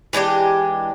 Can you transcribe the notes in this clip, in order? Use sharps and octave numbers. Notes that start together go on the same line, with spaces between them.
E3 G#3 D4 G4